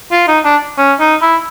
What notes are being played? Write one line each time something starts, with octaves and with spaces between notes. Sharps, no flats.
F4
D#4
D4
C#4
D#4
E4